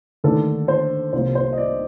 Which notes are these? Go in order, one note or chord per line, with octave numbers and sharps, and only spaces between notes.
D#2 D3 A3 D4 A4
C5
C2 C3 F3 A#3 C5
C5
D#5
D5